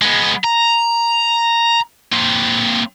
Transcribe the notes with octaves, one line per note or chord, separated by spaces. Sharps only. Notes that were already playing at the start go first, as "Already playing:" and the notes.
G#3 B3
A#5
A#3 C4